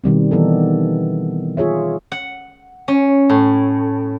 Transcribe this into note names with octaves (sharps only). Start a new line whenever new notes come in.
B2 D#3 G3 C4
E3 B3 D#4 A4
F4 G#4 C#5 E5
F#5
C#4
A2